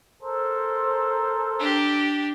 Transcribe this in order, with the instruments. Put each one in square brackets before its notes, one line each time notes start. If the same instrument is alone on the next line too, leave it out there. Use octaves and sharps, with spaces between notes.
[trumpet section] A4 A#4 C5
[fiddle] D4 G4